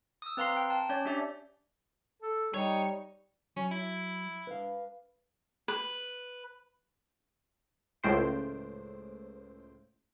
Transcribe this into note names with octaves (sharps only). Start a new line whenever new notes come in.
D#6 E6
C4 B4 F5 A#5 C6 C7
G5
A5
C#4 C#5 D5
C#4 D4 G4 D5 E5
A4
G3 D#4 C#5
F#3 C#4
E4
B4 F5
B4
C#2 A2 C5 D7